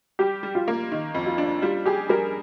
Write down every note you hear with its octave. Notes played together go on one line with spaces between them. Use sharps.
G3 G4
G3
F4
A#3
D#3
F2
F4
D4
G3 F4
G4 G#4
G3 A#4